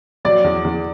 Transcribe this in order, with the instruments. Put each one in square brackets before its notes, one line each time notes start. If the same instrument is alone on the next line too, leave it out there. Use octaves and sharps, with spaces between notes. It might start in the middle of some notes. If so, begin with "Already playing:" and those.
[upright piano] F#3 [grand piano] D5
[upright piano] E2
E2